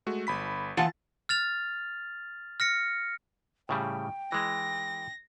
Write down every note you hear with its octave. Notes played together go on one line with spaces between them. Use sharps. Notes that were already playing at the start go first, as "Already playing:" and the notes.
G#3 A3 F#4
G1 B5 B6
E3 F4 F#5 A5 A6
F6 A6 F7
F6 A#6 C#7
A2 C#3 G3 G5
E3 G#3 A#6